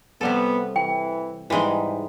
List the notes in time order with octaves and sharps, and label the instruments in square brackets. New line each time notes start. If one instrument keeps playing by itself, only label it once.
[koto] C3 G3 A4 [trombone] B3
[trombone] E3 [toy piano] G5
[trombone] G#2 [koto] E3 G#3 [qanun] G3 D#4